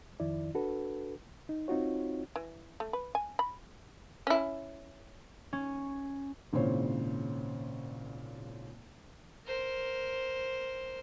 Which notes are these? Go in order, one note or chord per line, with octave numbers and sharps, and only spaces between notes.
F2 D#3 E4 D5
D4 F#4 A4 B4
D#4
C4 D#4 F4 F#4 C#5
E3
A3
B4
G#5
B5
C#4 E4
C#4
G#1 A#2 C#3 E4 C5 C#5
A#4 C5